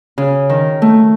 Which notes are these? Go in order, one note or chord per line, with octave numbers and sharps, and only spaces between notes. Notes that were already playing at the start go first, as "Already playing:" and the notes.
C#3
D#3
A3